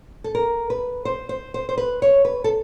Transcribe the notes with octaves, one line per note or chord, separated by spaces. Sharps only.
A4
A#4
B4
C5
C5
C5
C5
B4
C#5
B4
A4